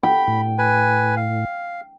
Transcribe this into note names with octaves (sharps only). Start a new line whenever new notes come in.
G5 B5
A2
B4 G#5
F5